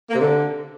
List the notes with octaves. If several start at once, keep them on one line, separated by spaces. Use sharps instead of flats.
A#3
C3
D3